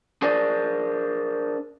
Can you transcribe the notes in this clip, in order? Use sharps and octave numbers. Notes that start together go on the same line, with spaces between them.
D4 G#4 A#4 C5 D5